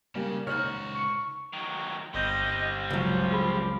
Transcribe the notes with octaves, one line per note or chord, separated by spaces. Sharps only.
C#3 G3 A#3
C#2 D#4 F#4 C5 C#5 F6
C#6
D#3 F#3
G1 G3 C4 D#5 G6
C#2 F3 F#3
G#4 B5